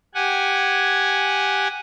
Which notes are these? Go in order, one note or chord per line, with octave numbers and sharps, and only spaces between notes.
G4 F#5 G#5